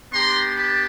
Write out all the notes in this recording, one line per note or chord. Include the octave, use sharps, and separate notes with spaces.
B3 D4 G4 A#5 C6
A5 B5